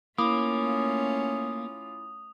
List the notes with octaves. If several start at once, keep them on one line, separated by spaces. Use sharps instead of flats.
A3 A#3 C#4 E4 F4 B5 D6 D#6